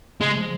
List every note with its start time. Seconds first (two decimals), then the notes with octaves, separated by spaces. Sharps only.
0.21 C#3 G#3
0.36 F3